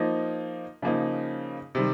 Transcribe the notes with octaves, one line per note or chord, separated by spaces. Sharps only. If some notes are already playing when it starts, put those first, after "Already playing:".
Already playing: F3 A#3 D#4
C#3 F3 A#3 D#4
C3 D#3 G3